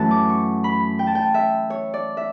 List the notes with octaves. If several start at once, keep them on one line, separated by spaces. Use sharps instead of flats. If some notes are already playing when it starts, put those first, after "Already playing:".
Already playing: F#2 E3 A3 F#5 A5
D6
C#6
B5
G5
A5
G5
E5
C#5
D5
E5